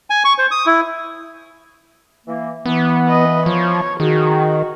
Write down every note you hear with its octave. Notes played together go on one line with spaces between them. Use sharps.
G#5
C#6
C5
D#6
E4
E3 A#3
E3 B3
B4 D#5
F3 C#5
D#3 F#4 G#4